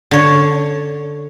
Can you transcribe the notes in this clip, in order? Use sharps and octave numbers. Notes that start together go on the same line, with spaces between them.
D3 C#5